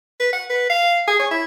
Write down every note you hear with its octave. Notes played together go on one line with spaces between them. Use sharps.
B4
F#5
B4
F5
G#4
C#5
E4